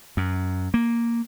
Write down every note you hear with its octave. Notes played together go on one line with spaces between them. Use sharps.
F#2
A#3